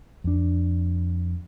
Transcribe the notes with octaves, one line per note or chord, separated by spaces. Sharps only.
F2 D4